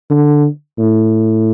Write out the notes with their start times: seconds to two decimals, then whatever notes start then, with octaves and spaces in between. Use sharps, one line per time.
0.10 D3
0.79 A2